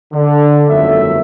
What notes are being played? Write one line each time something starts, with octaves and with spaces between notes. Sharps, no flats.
D3
G1 F2 D#3 F#3 A3 E5